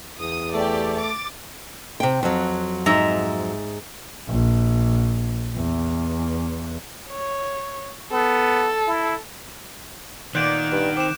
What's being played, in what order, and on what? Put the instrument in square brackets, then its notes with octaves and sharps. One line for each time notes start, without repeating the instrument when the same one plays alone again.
[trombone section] E2 [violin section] D#6
[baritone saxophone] A3 [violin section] G4 D5
[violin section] D6 A6
[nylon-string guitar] C3 G5
F2 F#3
[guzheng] G#2 E5 A#5
[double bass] A#1
E2
[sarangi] C#5
[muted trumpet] B3 [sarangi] A4
[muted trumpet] E4
[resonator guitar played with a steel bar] A#2 B3 [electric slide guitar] D#3 [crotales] F#6 G6 D7
[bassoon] G2
[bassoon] C4 [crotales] D6 E7